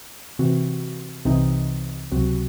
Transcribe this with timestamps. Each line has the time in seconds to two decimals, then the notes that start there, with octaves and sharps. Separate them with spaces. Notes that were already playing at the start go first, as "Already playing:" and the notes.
0.39 C3 E3 C4 F#4
1.25 C2 C3 E3 C4 D#4
2.12 C#2 C3 F#3 C4 F#4